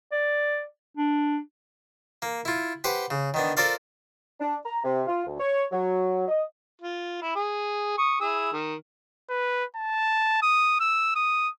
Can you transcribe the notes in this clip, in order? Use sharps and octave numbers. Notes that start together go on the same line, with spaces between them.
D5
D4
A#3
E4 F4
G4 B4 C5 F#5
C#3
D#3 B3 D4
F4 A4 A#4 C5 D5 F5
D4
A#5
C3
F4
D2
C#5
F#3
D#5
F4
E4
G#4
C#6 D#6
E4 G#4 E6
D#3
B4
A5
D#6
E6
D#6